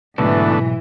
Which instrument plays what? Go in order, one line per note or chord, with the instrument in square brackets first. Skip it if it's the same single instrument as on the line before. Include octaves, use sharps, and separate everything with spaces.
[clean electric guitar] B1 [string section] G#2 E3 [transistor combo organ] B2 D3 A3